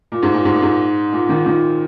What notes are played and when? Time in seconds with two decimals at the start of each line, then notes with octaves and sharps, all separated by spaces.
0.12 A#2
0.22 G#2
0.34 A#2
0.45 G#2
0.54 A#2
0.62 G#2
1.12 A#2
1.29 A#2 D#3
1.46 A#2 D#3